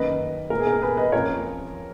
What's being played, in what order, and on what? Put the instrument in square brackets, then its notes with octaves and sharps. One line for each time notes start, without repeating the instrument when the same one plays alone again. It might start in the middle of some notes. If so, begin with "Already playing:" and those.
Already playing: [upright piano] F#2 D#3 A#3 D#4 B4 D#5
A#2 G#3 B3 A#4
G#4
A#4
G#4 B4
B4 D#5
F2 F3 A#3 C#4 A#4 C#5